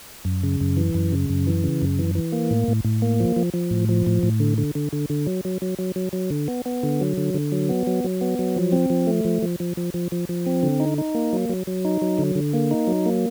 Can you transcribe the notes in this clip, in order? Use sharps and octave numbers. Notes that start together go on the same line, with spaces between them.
F#2
C#3
F#2
E3
F#2
C#3
F#2
E3
C#3
F#2
E3
E3
A#3
A2
A2
A2
A#3
F3
F3
F3
A2
F3
A2
A2
D3
D3
D3
D3
D3
F#3
F#3
F#3
F#3
F#3
F#3
D3
B3
B3
D3
F#3
D3
D3
F#3
B3
F#3
F#3
B3
F#3
F3
C4
F3
A3
F3
F3
F3
F3
F3
F3
F3
C4
D3
D#4
D#4
A#3
F#3
F#3
F#3
D#4
F#3
D3
D3
A#3
D#4
F#3
A#3